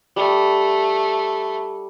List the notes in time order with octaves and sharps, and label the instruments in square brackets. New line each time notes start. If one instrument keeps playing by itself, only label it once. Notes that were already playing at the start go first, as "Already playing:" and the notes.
[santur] G3 [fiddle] A3